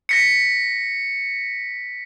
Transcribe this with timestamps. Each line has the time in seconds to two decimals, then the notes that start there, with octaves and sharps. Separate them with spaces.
0.09 A#6 B6 C#7